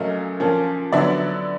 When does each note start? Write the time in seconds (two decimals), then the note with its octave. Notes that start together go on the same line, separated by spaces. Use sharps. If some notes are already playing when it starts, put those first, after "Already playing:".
Already playing: A#2 F#3 A3 C#4 D#5 F5
0.40 A#2 F3 A#3 C#4
0.92 D3 F#3 B3 D5 E5